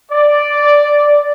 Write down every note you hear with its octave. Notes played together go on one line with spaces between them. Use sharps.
D5